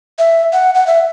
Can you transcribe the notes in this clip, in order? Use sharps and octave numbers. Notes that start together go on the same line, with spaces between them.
E5
F#5
F#5
E5